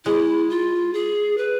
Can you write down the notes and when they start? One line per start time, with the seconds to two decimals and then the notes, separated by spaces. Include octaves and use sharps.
0.05 G#3 E4
0.50 F4
0.93 G#4
1.38 B4